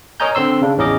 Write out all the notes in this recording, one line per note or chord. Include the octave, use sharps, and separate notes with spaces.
A#4 C#5 D#5 G#5 A#5 G6
D3 C4 C6 E6
C#3 D4
A1 E2 C#4 D#4 D#5 D6